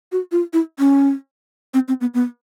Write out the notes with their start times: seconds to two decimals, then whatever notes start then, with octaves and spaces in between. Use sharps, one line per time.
0.12 F#4
0.32 F4
0.53 E4
0.79 C#4
1.74 C4
1.88 C4
2.01 B3
2.14 B3